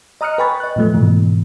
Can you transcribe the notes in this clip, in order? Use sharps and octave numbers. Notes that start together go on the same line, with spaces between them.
D#5 A#5 D#6 F6 F#6 C#7
B4 G5 G#5 B5 C#6 A6
D#5 F#6
A2 F3 A3
G#2 B2 E3